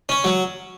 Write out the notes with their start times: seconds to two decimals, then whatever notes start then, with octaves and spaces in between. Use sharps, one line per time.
0.09 C#4
0.24 F#3